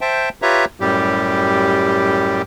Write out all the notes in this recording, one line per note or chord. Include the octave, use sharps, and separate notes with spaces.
C5 E5 G5 A5
F4 G4 B4 C#5 E5 A#5
F#2 A2 G3 G4